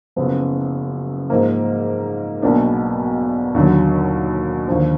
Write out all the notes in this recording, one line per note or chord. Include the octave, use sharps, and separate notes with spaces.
F#1 F#2 F3 B3
G#2 F3 A#3
B1 B2 A#3 D4
D#2 D3 F#3
D#2 D3 F3